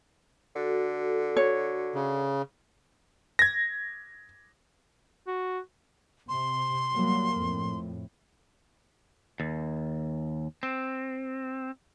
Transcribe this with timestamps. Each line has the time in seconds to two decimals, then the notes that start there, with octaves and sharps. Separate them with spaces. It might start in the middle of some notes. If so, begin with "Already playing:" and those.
0.56 D3 F#4 A4
1.37 C#5
1.95 C#3
3.39 G#6 A#6
5.27 F#4
6.29 C3 C6
6.93 F#3 G3 A#3
7.37 F2 A2
9.40 D#2
10.63 C4